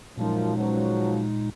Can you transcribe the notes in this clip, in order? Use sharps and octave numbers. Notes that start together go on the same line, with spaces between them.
F#2 A#2 F3 G#3 D#4
C#2 F3 F#3